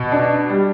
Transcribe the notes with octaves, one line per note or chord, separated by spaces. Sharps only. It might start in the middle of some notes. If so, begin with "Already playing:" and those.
Already playing: B2
D4
G3